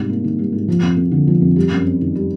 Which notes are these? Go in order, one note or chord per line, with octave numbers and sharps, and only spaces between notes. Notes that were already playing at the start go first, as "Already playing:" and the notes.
Already playing: G#2 C3 G3
A#3
D#3
G3
G#2
F3
F2
F2
D3
F3
F2
G3
F#2
C4
D#3
G3